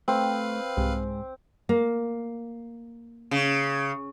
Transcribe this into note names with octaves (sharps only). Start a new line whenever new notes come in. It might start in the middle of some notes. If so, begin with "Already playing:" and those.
A3 C4 B4 F5
C2 G#2 G#3
A#3
C#3